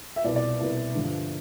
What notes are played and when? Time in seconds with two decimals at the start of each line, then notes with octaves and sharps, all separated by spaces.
0.16 E5
0.24 C2 B2 D5
0.36 D5
0.60 C2 B2
0.95 G2 D3 F3